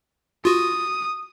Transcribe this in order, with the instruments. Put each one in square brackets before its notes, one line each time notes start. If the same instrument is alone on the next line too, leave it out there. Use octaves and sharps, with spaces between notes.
[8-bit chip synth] F4 F#4 [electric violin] D#6